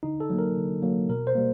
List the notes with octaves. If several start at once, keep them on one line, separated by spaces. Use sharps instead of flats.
D3 D#4
A4
F#3 A#3
A#4
D3
F#3 A#3
B2 A#4
C5
G3 A#3